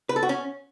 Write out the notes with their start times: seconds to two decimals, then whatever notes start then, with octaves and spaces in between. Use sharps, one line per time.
0.09 B4
0.16 A4
0.23 F#4
0.29 C#4